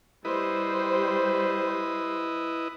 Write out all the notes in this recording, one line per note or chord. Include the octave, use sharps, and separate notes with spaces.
G3 E4 B4 C5 D#5